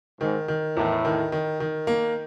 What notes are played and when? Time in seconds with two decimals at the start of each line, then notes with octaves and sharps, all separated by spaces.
0.21 G#2 D#3
0.48 D#3
0.76 E2 A2
1.05 D#3
1.32 D#3
1.60 D#3
1.87 A#3